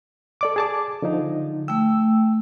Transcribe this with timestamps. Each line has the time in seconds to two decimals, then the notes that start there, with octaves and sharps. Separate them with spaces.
0.41 A4 D5 D6
0.56 G#4 A5 D6
1.02 D3 F3 D#4
1.68 A3 G5 E6